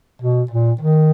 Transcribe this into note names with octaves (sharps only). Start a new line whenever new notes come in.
B2
A#2
D#3